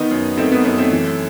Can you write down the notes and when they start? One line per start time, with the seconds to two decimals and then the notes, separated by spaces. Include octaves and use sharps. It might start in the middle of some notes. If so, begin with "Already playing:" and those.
Already playing: D#3 B3 D#4
0.11 F#2
0.37 D#3 A3 C4
0.52 B3
0.64 F#2 B3
0.78 A3 C4
0.91 E3